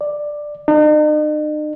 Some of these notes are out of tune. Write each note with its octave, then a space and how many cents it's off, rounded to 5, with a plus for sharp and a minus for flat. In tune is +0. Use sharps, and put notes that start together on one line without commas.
D5 +10
D#4 -45